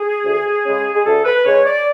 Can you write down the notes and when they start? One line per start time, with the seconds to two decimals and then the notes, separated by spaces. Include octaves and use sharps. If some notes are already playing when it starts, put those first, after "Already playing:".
Already playing: G#4
0.24 D2
0.64 C#3 G#3 C#4
0.94 G#4
1.05 D2 A4
1.25 B4
1.45 C#3 G#3 C#4 C#5
1.66 D5